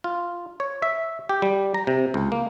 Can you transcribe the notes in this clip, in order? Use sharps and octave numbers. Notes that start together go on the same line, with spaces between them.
F4
C#5
E5
G4
G3
A#5
C3
C#2
A#3